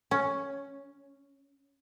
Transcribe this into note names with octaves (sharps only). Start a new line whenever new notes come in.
C#4